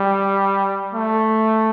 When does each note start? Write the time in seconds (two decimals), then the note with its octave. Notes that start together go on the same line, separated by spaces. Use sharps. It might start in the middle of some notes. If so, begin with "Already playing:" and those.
Already playing: G3
0.94 A3